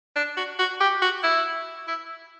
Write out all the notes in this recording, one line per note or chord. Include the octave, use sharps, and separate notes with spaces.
D4
F#4
F#4
G4
F#4
E4
E4